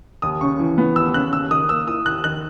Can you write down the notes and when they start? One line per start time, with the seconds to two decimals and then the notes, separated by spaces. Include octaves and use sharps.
0.22 D#2 D#6
0.41 C#3 C#6
0.59 E3
0.78 B3
0.96 D#2 E6
1.14 C#3 F#6
1.33 D#2 E6
1.51 D#3 D#6
1.69 A#3 E6
1.87 E4 D#6
2.06 D#2 F#6
2.24 D#3 F#6